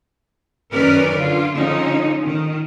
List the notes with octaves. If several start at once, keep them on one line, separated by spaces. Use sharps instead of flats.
F#2 D#3 C#4 A#4 B4 D5
D3 F4
D3 F3 G#3 C#4 D#4
D#3